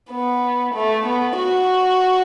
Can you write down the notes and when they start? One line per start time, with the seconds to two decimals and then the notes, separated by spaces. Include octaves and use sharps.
0.11 B3
0.74 A3
1.06 B3
1.38 F#4